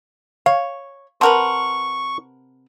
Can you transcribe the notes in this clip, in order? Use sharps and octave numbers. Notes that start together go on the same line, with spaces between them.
C#5 F5
C3 A#4 B4 F#5 A5 C6 C#6